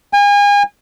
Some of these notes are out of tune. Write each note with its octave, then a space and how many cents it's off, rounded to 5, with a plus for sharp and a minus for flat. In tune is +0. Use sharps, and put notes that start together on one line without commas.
G#5 -35